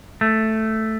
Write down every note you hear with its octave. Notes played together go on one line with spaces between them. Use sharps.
A3